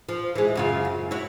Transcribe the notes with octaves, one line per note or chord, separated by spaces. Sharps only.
F3
E3 G#3
F#2 C#3 F4
F#2
E4 F#4 C#5